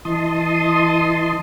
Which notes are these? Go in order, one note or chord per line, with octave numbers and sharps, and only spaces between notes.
E3 D#5 A5 C6 D#6